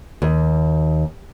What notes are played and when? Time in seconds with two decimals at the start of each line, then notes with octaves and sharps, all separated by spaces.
0.22 D#2